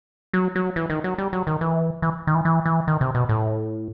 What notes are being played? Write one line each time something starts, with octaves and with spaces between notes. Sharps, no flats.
F#3
F#3
E3
D#3
F#3
G3
F#3
D#3
E3
E3
D#3
E3
E3
E3
D#3
C3
B2
A2